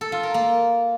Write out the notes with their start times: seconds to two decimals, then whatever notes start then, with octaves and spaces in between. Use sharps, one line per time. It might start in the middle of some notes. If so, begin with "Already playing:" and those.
0.01 A4
0.12 F4
0.23 A#4
0.34 A#3